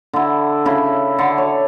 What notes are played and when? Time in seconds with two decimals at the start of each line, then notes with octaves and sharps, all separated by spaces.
0.13 D3 E4
0.66 C#3 E4
1.19 D3
1.38 C#5